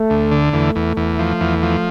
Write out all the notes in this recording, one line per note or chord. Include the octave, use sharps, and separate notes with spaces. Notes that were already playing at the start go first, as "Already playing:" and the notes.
Already playing: A3
D2
D3
E2 A3
E2
E2
F3
E2
F3